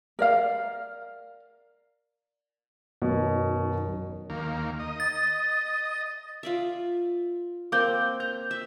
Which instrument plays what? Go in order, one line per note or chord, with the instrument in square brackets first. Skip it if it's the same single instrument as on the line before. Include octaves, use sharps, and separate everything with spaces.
[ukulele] A#4 D5 F5
[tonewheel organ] F#2 D#3 F#3 [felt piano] B2
[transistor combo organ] D#2 A#3
D#5
[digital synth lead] A6
[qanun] F4 D5 E5
[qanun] A#3 C4 [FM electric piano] D6 G6
[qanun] A#5 [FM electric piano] G6
[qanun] E5